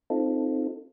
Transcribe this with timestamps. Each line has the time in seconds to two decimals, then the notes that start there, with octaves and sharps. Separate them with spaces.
0.10 C4 D#4 F4 A4